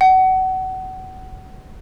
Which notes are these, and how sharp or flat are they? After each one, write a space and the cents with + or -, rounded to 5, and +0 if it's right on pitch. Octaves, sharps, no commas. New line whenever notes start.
F#5 +25